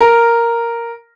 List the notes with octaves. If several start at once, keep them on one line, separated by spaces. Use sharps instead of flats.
A#4